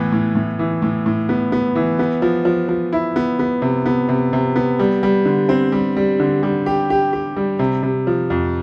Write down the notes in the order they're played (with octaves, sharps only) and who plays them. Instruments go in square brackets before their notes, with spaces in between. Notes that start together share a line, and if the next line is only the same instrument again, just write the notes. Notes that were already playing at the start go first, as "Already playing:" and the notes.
Already playing: [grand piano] A2 E3 B3
A2
A2
E3
A2
A2
B3
B3
E3
B3
F3
F3
F3
E4
B3
B3
C3
B3
C3
C3
B3
G3
G3
D3
C4
G3
G3
D3
G3
G4
G4
G4
G3
C3
C3
F3
F2